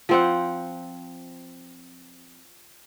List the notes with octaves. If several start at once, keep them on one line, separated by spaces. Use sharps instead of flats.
F3 C4 F#5